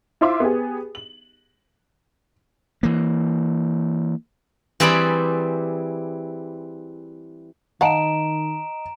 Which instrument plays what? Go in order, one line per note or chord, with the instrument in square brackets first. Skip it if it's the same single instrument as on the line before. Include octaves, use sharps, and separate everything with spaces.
[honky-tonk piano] E4 F4 C5 E5 C6 D6
B3 G4 G#4
F#7
[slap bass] E3 A#3
[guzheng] E3 G3 C4 G#4 D5 B5
[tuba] D#3 [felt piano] D#5 [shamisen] F5 F#5 A5 [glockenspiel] A#5 D7 E7